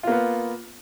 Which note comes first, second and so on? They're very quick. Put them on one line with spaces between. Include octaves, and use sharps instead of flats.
F4 A#3 B3